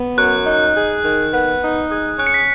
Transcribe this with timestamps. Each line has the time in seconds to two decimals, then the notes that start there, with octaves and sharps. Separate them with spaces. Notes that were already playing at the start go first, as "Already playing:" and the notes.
Already playing: B3
0.17 F#2 F#6
0.46 D#4
0.75 G#4
1.05 D#3
1.33 B3
1.62 D#4
1.90 G#4
2.18 C#4 F#6
2.27 C#7
2.34 B6